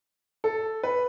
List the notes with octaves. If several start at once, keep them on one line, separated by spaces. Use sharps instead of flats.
A4
B4